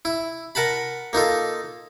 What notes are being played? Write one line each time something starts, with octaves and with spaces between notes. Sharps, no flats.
E4
A#4 F#5 A5 B5
A#3 D#4 F4 A4